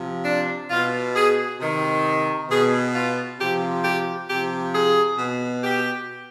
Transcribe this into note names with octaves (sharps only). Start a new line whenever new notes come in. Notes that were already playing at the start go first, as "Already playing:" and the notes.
Already playing: C3 F3
D4
B2 F4
G#4
C3 D#3
B2 G#4
F4
C3 F3 G4
G4
C3 F3 G4
G#4
B2
G4